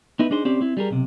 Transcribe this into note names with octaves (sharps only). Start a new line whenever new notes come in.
B3 D#4 E4 B4
D4 D#4 G#4 C5
C4 C#4 G4 C5 D5
C4 E4
G3 G#4 A#4
B1 C3